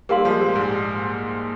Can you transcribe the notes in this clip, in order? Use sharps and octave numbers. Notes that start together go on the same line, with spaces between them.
G3 A#3 G4 A#4 F5 C6
F3 G#3
A#2
G#2